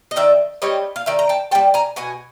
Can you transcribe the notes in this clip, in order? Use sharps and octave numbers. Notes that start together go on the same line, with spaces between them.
D#5
D#3 D5 E5
G3 C4 C#5 D#5
F5
D#3 D5 E5
A#5
G5 A5
G3 C4 G5 A5
G#5 A#5
B2 F#5 G#5